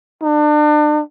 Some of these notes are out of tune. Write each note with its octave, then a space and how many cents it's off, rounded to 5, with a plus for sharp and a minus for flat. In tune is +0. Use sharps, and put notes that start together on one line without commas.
D4 +35